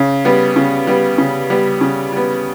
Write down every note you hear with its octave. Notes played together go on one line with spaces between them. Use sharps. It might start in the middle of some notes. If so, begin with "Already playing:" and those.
Already playing: C#3
G3 B3
C#3
G3 B3
C#3
G3 B3
C#3
G3 B3